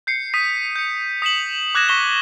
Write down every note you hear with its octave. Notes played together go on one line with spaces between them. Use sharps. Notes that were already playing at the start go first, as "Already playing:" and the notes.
G6 C7 C#7
D#6 B6 C7 D#7
G6 C#7
D#6 B6 E7 F#7
D6 F#6 G#6 A#6 E7
C#6 A#6 B6 E7 G7